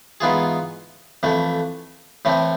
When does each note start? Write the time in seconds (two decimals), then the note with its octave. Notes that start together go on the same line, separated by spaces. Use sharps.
0.21 G#2 E3 B3 F4 G#4
1.23 F2 E3 A3
2.25 A2 E3 A3 C4